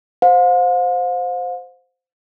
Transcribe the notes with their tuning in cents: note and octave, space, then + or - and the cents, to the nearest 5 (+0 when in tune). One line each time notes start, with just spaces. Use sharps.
C5 -10 F5 +45